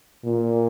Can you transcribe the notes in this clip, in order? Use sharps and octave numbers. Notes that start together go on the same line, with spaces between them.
A#2